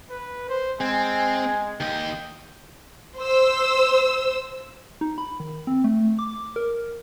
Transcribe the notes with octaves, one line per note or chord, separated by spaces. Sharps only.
B4
C5
G#3 C4 G#5
D#2 D#5 G5
C5 E6
D#4
B5
D#3
C4
A3
D6
A#4